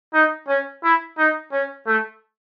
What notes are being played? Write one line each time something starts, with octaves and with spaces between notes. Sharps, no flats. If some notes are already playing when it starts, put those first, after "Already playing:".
D#4
C#4
E4
D#4
C#4
A3